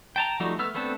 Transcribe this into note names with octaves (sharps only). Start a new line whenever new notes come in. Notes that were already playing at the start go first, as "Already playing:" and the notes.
G5 A5 A#5
F3 G3 A3 D#4 F#4
A3 B3 E6 F6
A3 B3 C4 D4 A4